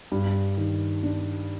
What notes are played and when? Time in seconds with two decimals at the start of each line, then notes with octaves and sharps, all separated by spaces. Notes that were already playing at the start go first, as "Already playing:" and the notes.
0.12 G2
0.58 D#3
1.03 D4